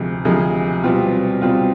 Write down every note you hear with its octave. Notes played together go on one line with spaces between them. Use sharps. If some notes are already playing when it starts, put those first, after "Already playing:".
Already playing: D2 C3 F3 G#3
D2 C3 F3 G#3
B2 G3 C4 F4
B2 G3 C4 F4